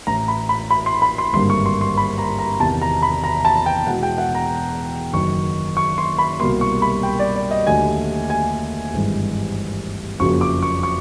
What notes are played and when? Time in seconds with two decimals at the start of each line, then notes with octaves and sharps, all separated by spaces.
0.07 A1 A2 E3 A#5
0.28 B5
0.49 B5
0.71 B5
0.86 C6
1.02 B5
1.18 C6
1.33 G#1 G2 D3 G3 A#3 C6
1.50 C#6
1.66 C6
1.81 C6
1.98 B5
2.18 A#5
2.39 A#5
2.60 E2 C3 D#3 A5
2.82 A#5
3.02 B5
3.24 A#5
3.45 A5
3.66 G5
3.87 E2 B2 G#3 F#5
4.03 G5
4.18 F#5
4.35 A#5
5.13 F#1 F#2 D#3 C#6
5.77 C#6
5.98 C6
6.19 B5
6.40 C2 B2 G3 A#3 C6
6.61 C#6
6.82 B5
7.03 G5
7.19 D5
7.36 D5
7.51 D#5
7.67 D#2 D3 F#3 A3 G#5
8.30 G#5
8.93 G#1 G2 E3 G#3
10.20 F#1 F2 C#3 F#3 A#3 C#6
10.41 D6
10.63 C#6
10.83 C#6